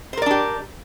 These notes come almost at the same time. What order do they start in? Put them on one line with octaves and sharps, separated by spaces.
C5 A#4 D5 D4 G4